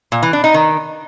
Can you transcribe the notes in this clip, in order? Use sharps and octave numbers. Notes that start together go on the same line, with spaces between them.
A#2
E3
D4
D#4
D#3